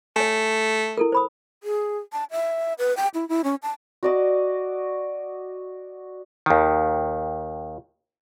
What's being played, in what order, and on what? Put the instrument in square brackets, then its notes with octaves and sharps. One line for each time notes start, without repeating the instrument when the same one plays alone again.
[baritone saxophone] A3 [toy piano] C#5 G#5
[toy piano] E4 A4 A#4
C5 B5 D#6
[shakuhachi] G#4
A5
E5
B4
G5
E4
E4
C#4
A5
[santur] F#4 D5 D#5
[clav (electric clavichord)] D#2 D#3